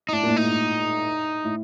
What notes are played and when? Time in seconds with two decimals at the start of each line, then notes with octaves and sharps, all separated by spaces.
0.09 D#4
0.12 A2 D4
0.23 A#2
0.29 A2
0.36 D#4
0.44 G#2
1.45 A2